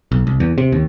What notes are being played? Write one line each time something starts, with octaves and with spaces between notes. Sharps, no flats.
B1
C2
E2
C3
D#2